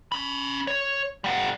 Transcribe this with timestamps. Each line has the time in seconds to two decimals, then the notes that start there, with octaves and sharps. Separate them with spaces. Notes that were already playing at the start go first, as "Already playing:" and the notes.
0.12 C#4 B5
0.67 C#5
1.24 G3 F#5